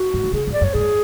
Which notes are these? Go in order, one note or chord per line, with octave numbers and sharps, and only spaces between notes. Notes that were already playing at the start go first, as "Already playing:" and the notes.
Already playing: F#4
G#2
D3
C#3 G#4
A2
D5
F#2
C#5
G#2 G#4